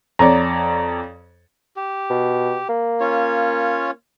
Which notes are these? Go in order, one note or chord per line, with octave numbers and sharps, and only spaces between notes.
F2 C#5 D5 A#5
G4
B2
A#3
C#4 F4 C#5